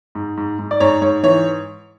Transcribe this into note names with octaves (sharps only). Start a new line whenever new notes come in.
G#2
G#2
G#2
D5
G#2 C#5
G#2 C#5
E3 C#5